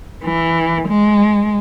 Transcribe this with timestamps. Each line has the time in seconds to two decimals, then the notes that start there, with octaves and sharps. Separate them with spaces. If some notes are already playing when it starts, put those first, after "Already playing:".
0.24 E3
0.88 G#3